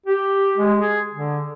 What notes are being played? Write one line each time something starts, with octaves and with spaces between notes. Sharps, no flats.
G4
G#3
G#4
D3